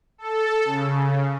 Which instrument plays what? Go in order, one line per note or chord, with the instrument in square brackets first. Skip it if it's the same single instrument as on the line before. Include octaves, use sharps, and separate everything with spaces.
[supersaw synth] A4
C#3